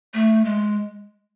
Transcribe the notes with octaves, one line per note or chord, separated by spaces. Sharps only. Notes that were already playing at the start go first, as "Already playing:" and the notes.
A3
G#3